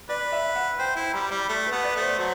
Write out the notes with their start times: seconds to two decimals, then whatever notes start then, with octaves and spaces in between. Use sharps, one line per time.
0.09 B4 D5
0.32 E5
0.55 F#5
0.79 C5 G5
0.96 E4
1.14 G3 B5
1.31 G3
1.49 A3
1.67 B4
1.72 B3
1.83 D5
1.96 A3
2.01 C5
2.18 F#3 C5